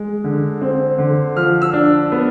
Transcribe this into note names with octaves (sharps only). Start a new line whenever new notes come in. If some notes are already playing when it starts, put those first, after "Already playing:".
Already playing: G#3
D3
C4
D3
F3 F6
E6
D4
B3